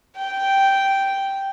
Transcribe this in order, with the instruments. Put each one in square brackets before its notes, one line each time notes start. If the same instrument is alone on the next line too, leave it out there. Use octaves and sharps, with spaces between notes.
[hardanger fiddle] G5